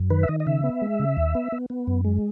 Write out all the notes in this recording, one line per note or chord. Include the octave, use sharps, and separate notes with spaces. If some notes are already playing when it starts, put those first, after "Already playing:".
Already playing: F#2
D#3 B4
E5
D#3 D#5
D#5
C#3 E5
B3
G#3
C#3
D#2
B3
B3
B3
F#2
G#3